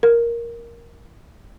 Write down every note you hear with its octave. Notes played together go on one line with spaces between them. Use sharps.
A#4